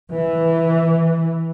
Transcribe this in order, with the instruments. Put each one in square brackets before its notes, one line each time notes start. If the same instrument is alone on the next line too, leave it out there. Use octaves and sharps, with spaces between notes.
[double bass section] E3